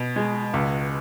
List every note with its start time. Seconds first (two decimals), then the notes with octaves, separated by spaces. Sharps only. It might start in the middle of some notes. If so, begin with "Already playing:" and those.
Already playing: B2
0.16 G#3
0.53 C#2